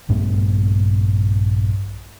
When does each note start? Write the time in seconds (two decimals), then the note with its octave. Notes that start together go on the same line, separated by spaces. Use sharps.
0.09 A#1 G2 A3 B3